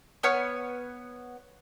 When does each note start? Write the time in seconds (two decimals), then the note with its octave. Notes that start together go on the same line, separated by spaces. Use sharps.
0.23 B3 C#5 F6